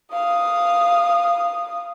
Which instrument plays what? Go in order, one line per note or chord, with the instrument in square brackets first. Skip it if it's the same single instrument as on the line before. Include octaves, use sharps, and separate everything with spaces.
[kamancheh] F5 D#6